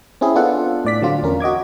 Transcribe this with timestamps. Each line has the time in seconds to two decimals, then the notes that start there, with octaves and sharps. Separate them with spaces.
0.21 C4 C#4 E4 G#4
0.35 B3 D4 F4 A4 F#5
0.85 A2 D5 B6
1.02 D3 F#3 C4 F4
1.23 E2 C#4 A#4
1.40 F#4 D#5 D6 G#6